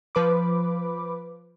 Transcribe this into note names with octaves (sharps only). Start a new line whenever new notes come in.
F3 B4 B5 D6